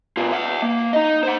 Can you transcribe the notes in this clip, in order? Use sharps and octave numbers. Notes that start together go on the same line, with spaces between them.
B2 F4
E5 F#5
A#3
D#4 D#5
C5 F#5